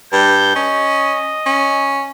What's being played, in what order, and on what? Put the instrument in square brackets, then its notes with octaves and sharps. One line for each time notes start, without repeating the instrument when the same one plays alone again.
[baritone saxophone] G2 [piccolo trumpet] G6
[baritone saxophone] C#4 [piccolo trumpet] D#5
[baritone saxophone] C#4